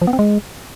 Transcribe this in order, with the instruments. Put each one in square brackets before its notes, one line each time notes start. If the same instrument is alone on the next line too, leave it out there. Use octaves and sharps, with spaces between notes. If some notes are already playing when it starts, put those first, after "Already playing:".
[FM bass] F3
B3
C4
G#3